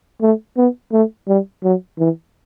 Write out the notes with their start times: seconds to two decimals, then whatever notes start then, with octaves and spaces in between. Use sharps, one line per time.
0.22 A3
0.57 B3
0.92 A3
1.28 G3
1.63 F#3
1.99 E3